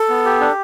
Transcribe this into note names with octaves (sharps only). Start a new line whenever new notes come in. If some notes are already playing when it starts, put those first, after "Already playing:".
Already playing: A4
B3
G4
D4